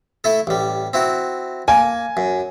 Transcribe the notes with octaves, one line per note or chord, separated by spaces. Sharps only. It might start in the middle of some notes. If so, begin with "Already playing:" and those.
A3 E4 A4
A1 G3
C4 E4 F#4
A#3 G#5
F#2